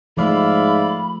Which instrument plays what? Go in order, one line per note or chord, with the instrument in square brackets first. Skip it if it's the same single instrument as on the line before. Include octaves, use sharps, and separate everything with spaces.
[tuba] G#2 [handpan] F3 A3 [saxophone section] D5 E5 F5 [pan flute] B5